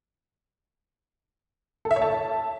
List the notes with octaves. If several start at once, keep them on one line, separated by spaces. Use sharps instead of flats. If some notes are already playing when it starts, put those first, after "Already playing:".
A4
E5
C#5
A5